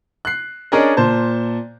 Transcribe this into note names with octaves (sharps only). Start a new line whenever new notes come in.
F#6 C7
C#4 D4 G#4 A#4 D5 D#5
A#2 C5 A5